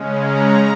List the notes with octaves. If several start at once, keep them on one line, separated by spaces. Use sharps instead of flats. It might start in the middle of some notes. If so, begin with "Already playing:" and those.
Already playing: C#3 G#3 C#4
A#5